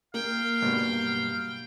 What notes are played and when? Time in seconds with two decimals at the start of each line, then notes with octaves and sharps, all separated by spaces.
0.14 A#3 F5 G5
0.62 B1 G2 B2